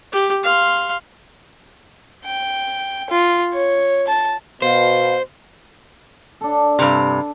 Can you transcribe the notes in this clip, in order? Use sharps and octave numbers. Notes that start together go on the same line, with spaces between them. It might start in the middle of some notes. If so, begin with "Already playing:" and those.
G4
F5 C6
G5
F4
C#5
A5
B2 C5 F5
D4 A4
G2 C3